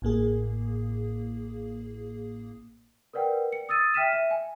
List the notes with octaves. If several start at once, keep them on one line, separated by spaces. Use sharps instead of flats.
A1 A2 A#3 G#4
A#4 B4 D5 F#5 G5
C#7
D#6 E6 A6 D#7
E5 G5 F6 B6 D#7 E7
E5
G#5